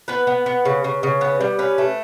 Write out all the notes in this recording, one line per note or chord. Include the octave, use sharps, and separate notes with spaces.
B3 B4
B3
B3
C#3
C#3
C#3
B3
G3
C#4 B4
A3